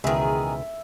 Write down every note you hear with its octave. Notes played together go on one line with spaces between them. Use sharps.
C#2 B2 D#3 E3 G#4 E5